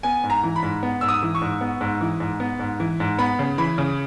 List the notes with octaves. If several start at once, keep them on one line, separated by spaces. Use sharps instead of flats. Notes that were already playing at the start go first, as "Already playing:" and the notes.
B3 G#5
G#2
A#5
E3
B5
G#2
B3
G#2 E6
D#6
E3
C#6
G#2
B3
G#2
E3
G#2
B3
G#2
E3
G#2
B3 B5
C#3
E3 B5
C#3